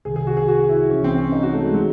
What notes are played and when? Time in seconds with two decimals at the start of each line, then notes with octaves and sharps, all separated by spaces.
0.05 C2 C3 D#3 G#4
0.16 G#4
0.27 F#4
0.37 G#4
0.48 F#4
0.69 E4
0.89 C2 C3 E3 C#4
1.04 C4
1.18 C#4
1.32 D#4
1.43 F#4
1.53 A3
1.65 G#3
1.74 E3 F#3 A3 D#4 G#4